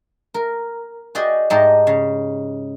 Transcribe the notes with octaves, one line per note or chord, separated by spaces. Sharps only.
A#4
F#4 G#4 D5 D#5 G5
G#2 D#4 G4 D#5 A5
C#3